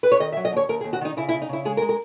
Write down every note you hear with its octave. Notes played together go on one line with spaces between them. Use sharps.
B4
C#5
D#3 D#5
E5
F#3
D#5
D#2 C#5
D#2 A#4
G#4
D#2
F#4
D#3 D#4
C#3 E4
E4
C#3
D#4
C#3 E4
G#3 G#4
A#4
G#3
A#4